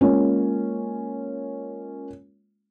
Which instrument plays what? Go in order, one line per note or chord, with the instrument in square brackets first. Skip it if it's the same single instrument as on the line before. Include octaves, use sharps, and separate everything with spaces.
[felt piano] G#3 A#3 C#4 F4